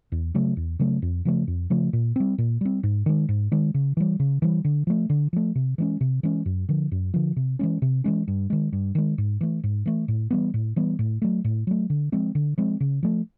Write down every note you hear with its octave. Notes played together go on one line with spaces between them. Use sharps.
E2
C#3 F#3 A3
E2
C#3 F#3 A3
F2
C#3 F3 A3
F2
C#3 F3 A3
A#2
G3 C4
A#2
G3 C4
G#2
D#3 G#3
G#2
D#3 G#3
C#3
E3 G3
C#3
E3 G3
D3
F3 A3
D3
F3 A3
C3
E3 G#3 C#4
C3
E3 G#3 C#4
F#2
D3 F3
F#2
D3 F3
C3
E3 G#3 C#4
C3
E3 G#3 C#4
G2
D#3 G#3
G2
D#3 G#3
G#2
E3 A3
G#2
E3 A3
A2
E3 G3 B3
A2
E3 G3 B3
A2
F#3 A3
A2
F#3 A3
D3
F3 G#3 C4
D3
F3 G#3 C4
C#3
F3 A3